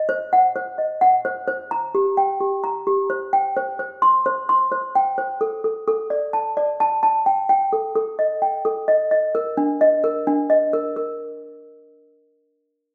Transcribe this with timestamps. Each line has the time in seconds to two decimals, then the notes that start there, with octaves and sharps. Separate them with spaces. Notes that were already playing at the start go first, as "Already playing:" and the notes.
Already playing: D#5
0.09 C5
0.33 F#5
0.56 C5
0.78 D#5
1.01 F#5
1.25 C5
1.47 C5
1.71 A#5
1.95 G4
2.17 G5
2.40 G4
2.64 A#5
2.87 G4
3.10 C5
3.33 G5
3.57 C5
3.79 C5
4.02 C6
4.26 C5
4.49 C6
4.72 C5
4.95 G5
5.18 C5
5.41 A4
5.64 A4
5.88 A4
6.10 D5
6.33 A5
6.57 D5
6.80 A5
7.03 A5
7.26 G5
7.49 G5
7.73 A4
7.95 A4
8.19 D#5
8.42 G5
8.65 A4
8.88 D#5
9.11 D#5
9.35 A#4
9.57 D4
9.81 D#5
10.04 A#4
10.27 D4
10.50 D#5
10.73 A#4
10.96 A#4